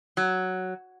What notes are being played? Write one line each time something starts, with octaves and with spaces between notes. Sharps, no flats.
F#3